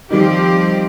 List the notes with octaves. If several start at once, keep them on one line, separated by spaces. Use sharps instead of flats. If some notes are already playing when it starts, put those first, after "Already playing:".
D#3 F3 G3 C4 G4